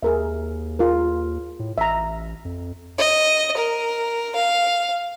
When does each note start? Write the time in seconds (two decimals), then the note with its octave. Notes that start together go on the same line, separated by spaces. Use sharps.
0.03 D#2 G#4 A#4 E5
0.79 F4 G#4 A#4
1.59 A2
1.78 A1 E5 A#5
2.45 F2
2.98 D#5
3.57 A#4
4.36 F5